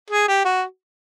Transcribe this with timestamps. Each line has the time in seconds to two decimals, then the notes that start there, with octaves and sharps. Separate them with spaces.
0.10 G#4
0.28 G4
0.45 F#4